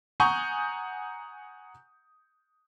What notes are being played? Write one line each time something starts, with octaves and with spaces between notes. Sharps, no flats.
F#5 G#5 A#5 C#6 D#6 G6